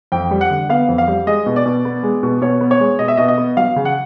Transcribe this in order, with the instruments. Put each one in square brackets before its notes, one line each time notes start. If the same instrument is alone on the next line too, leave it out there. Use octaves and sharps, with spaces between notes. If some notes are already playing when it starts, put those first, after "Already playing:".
[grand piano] F2 G5
G3
F#5
D3
B3 F5
F2
F5
G3
G#3 D#5
B2
D5
B2
B3
G#3
B2
B2 C#5
B3
C#5
G#3
B2 D#5
E5
B2 D#5
D#5
B3
F#3 F5
C#3
F#5